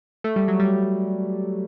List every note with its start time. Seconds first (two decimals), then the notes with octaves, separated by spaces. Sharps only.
0.24 A3
0.36 G3
0.48 F#3
0.60 G3